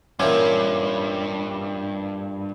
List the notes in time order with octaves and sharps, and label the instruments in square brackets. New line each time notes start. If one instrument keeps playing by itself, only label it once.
[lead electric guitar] G2 [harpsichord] A#2 E3 F#4 [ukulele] C#4